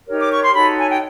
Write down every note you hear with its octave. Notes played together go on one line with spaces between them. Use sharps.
D#4 G4 A#4 C#5
D6
C#6
C6
D#4 F#4 A4 C#5 B5
G#5
G5